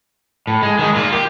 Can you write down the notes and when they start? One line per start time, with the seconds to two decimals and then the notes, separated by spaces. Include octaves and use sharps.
0.47 A2
0.63 G#3
0.79 D#3 G#3
0.95 A#3 F4
1.13 G4